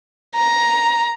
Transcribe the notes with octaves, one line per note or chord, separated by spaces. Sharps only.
A#5